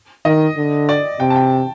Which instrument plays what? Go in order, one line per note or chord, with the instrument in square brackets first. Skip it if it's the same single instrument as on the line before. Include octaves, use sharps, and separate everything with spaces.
[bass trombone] D#3 [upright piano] D#5
[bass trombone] D3
[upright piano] D5
[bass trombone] C3 [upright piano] G5
[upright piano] A5
G5